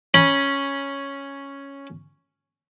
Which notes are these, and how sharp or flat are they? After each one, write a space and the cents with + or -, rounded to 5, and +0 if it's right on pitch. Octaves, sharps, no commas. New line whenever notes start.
C#4 +0 B5 -25